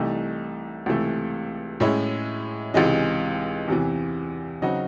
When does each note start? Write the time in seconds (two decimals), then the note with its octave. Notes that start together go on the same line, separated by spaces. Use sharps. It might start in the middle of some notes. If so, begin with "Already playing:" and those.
Already playing: C2 C3 E3 A3 D#4
0.86 C#2 C3 E3 A3
1.80 A2 G#3 C#4 E4
2.74 C#2 C3 E3 G#3 D#4
3.68 E2 C3 E3
4.62 C#3 F#3 C4 D#4 F#4